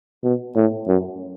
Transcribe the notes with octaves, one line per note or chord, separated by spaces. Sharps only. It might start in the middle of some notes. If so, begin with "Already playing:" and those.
B2
A2
F#2